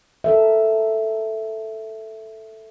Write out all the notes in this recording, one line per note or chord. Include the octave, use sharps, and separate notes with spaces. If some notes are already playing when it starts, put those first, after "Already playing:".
A4 A#4 E5